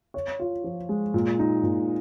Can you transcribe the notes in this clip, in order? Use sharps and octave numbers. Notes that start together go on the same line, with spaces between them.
C#5
F4
F3
G#3
A#2
D#4
A#2